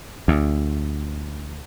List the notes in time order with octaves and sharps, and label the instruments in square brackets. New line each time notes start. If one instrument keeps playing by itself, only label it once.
[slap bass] D2